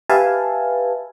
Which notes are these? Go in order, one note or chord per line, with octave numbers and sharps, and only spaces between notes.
G4 B4 E5 F5 G#5 A5